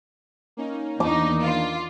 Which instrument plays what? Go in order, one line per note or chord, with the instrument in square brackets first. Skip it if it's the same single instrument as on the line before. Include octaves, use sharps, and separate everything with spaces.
[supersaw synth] A#3 C#4 D#4
[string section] E2 D#4 [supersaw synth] D#3 A#3 D4 [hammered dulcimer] D6
[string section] F4